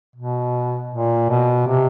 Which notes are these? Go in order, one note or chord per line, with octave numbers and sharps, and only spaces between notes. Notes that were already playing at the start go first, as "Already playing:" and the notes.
B2
A#2
B2
C3